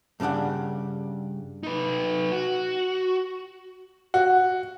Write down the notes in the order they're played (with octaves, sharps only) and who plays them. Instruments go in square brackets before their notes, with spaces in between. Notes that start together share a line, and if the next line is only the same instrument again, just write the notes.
[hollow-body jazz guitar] G2 C#3 E3 D4 F#5
[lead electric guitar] D#4 B4
F#4
[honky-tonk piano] F#4